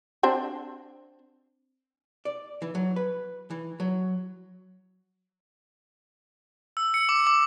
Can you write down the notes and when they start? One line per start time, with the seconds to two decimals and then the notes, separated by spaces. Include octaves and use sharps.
0.23 C4 D4 C5
2.25 D5
2.62 E3
2.75 F#3
2.96 B4
3.50 E3
3.80 F#3
6.77 E6
6.94 C#7
7.09 D6
7.27 D6